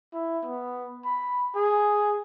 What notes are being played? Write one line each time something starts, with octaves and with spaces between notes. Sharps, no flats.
E4
B3
B5
G#4